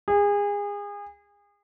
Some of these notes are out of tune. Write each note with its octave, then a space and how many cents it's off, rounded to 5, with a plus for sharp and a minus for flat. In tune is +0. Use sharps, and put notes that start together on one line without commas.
G#4 -30